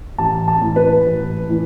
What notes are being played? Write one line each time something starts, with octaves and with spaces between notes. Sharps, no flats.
A1 A5
A5
A2 E3
B4
A1
A2 E3